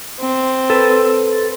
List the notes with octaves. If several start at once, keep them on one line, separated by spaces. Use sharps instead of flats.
C4
A4 B4